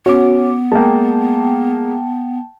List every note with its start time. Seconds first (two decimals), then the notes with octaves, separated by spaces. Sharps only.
0.06 B3 C#4 F#4 D6
0.72 G#3 A#3 G5 A5